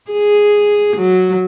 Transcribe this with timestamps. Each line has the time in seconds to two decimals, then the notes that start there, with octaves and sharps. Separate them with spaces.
0.11 G#4
0.97 F#3